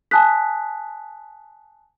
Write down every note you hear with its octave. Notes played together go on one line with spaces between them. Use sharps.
G#5 A5 D#6 F#6 B6